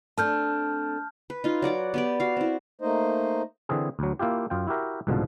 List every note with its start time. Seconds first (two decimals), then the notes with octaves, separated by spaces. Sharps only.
0.18 A3 C4 D4 A5 F6 G6
1.30 B4
1.44 D#4 F4
1.62 F#3 D5 F#5 D6
1.94 B3 G4 D5
2.20 F#4 F5
2.37 C4 E4
2.82 A3 A#3 D#4 C5 D#5
3.69 D3 E3 C4 G#4
3.99 D2 F#3
4.19 A#3 E4 F4 G4
4.50 F#2 F4 G5
4.67 E4 F#4 G4 A#4 E5
5.07 C2 G#2 B2 D3 F3